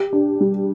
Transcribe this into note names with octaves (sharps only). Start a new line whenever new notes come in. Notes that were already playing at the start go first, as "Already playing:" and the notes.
Already playing: G4
D4
G3